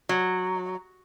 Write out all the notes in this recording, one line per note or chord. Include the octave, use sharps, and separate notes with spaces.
F#3